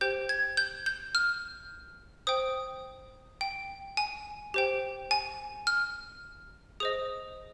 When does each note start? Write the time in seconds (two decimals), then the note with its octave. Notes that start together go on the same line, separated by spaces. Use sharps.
0.01 G4 C5 G5 G6
0.29 G#6
0.57 G6
0.86 G6
1.15 F6
2.27 C5 G5 D#6
3.41 G5
3.97 G#5
4.54 G4 C5 G5
5.11 G#5
5.67 F6
6.80 G#4 C5 D#5 D#6